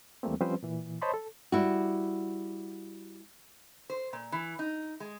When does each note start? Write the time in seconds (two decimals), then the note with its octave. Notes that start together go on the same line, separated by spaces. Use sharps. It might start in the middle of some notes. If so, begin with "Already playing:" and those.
0.23 D#2 E3 G3 A3 A#3 C4
0.41 F3 G3 C4 C#4 B4 C5
0.63 A#2 E3
1.02 C5 C#5 D#5 A5 B5 C6
1.14 A4
1.52 G3 E4 F#4
3.90 C5
4.13 A#2
4.32 E3
4.59 D#4
5.00 G#3